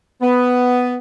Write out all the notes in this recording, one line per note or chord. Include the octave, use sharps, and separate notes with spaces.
B3